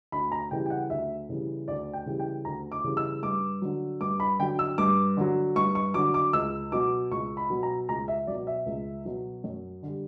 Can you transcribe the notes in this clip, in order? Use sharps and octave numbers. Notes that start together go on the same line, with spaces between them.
D2 B5
A#5
C#3 E3 G3 G5
G5
F#5
D2 E5
C#3 E3 G3
D2 D5
G5
C#3 E3 G3
G5
D2 A#5
D6
C#3 E3 G3
E6
G2 D6
D3 F#3
G2 D6
B5
D3 F#3 G5
E6
G2 D6
D3 F#3
G2 C#6
C#6
D3 F#3 D6
D6
C#2 E6
B2 F#3 D6
C#2 C#6
B5
B2 F#3
A#5
C#2 A#5
E5
B2 F#3 D5
E5
C#2
B2 F#3
F#2
D3 G3